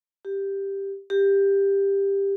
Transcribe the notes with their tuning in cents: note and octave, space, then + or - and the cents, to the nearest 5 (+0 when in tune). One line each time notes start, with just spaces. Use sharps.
G4 +5
G4 +15